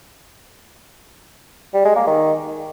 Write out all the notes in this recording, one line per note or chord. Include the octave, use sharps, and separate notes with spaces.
G3
G#3
A#3
D#3